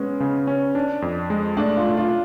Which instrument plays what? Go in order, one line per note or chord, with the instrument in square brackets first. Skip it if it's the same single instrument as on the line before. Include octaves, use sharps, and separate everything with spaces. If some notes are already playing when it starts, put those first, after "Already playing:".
Already playing: [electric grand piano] G#3 [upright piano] B3 C#4
[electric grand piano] C#3
C#4
D4
F2
G#3
[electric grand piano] A3 [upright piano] D4
[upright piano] F4
[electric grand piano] A3
[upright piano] F4